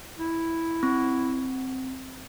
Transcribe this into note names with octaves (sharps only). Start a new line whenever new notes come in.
E4
C4